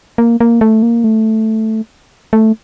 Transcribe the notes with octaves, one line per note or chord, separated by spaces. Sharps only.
A#3
A#3
A3
A#3
A3
A3